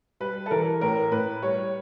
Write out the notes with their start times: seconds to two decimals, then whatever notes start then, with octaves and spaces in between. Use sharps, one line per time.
0.20 G3 B4
0.46 A4
0.51 E3 A#4
0.81 A2 A#4
1.12 A2 B4
1.42 G3 C#5